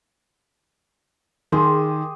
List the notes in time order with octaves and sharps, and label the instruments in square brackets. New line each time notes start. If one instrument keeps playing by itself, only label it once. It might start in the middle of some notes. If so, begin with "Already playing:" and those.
[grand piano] D#3 [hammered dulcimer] G4 G#4 C6